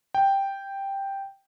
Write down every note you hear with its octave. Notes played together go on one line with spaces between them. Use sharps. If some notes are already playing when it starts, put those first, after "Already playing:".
G5